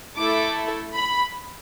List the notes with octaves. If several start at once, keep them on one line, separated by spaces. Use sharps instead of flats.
A3 E4 A4 D6
B5